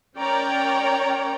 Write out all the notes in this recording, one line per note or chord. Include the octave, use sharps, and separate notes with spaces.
C#4 A#4 C#5 D5 G5 A#5